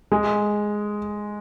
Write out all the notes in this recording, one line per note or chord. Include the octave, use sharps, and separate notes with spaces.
G#3